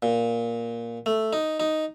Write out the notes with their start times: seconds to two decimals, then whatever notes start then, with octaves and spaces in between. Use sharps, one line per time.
0.02 A#2
1.06 A3
1.33 D#4
1.60 D#4